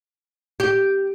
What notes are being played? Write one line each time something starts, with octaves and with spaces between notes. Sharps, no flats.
G4